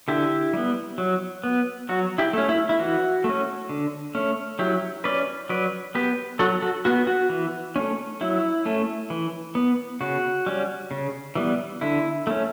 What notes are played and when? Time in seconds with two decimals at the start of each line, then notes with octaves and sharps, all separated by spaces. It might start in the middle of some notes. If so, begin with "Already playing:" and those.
0.08 D3 E4 G4
0.53 G3 B3
0.98 F#3
1.44 B3
1.89 F#3 F#4
2.18 E4 G4
2.33 A3 C#4
2.49 E4
2.69 E4
2.79 E3 F#4
3.24 A3 C#4
3.69 D3
4.15 A3 C#4
4.59 F#3 E4 G4
5.04 C#4 B4 D5
5.49 F#3 B4 D5
5.95 B3 G4 B4
6.39 F#3 F#4 A4
6.62 F#4 A4
6.85 B3 F#4
7.07 F#4
7.30 E3
7.76 A3 C#4
8.21 F#3 E4
8.65 A3 C#4
9.10 E3
9.55 B3
10.01 C#3 F#4
10.46 G3 C#4
10.91 C#3
11.35 E3 G3 B3
11.81 D3 E4
12.27 A3 C#4